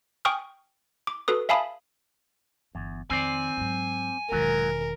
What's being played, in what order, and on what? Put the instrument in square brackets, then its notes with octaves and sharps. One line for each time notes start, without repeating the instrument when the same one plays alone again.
[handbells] G5 G#5 C#6 D#6 F6
D6
F#4 A4 B4 D#6
E5 F5 G#5 A5 B5 D#6
[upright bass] G1 [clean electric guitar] E2
[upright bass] F2 D#3 [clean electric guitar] C4 C5 D5 [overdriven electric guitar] G#5
[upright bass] G#2 F#3
[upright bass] E1 D#3 [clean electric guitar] G#2 F#3 [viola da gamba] A#4